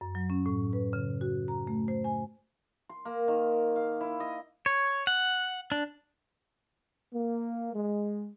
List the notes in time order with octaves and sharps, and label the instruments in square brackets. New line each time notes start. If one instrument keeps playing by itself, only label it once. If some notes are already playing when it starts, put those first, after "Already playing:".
[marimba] F#2
F#3
C#4
A2
B4
C#3
F#4
A#5
A3
C5
G#5
[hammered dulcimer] C6
A#3
D#3
F5
E4
D#5
[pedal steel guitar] C#5
F#5
D4
[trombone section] A#3
G#3